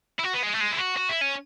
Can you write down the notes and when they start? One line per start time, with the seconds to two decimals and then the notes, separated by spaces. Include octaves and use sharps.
0.19 E4
0.23 F#4
0.33 B3
0.42 G#3
0.54 A3
0.60 G#3
0.72 E4
0.79 F#4
0.97 F#4
1.09 E4
1.21 C#4